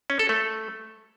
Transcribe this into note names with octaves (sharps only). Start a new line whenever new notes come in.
C#4
A4
A3